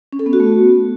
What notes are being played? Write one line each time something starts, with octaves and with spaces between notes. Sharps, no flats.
C#4
A4
B3
F#4
A3